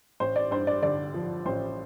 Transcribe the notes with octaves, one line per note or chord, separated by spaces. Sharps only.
A1 C5
D5
G2 C5
D5
D3 D5
F3
A1 C5